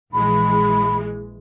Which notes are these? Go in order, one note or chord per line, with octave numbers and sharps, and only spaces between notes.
A#1 E3 G#3 B5